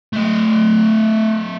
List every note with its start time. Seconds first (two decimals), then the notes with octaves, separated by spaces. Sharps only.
0.13 A3 D#5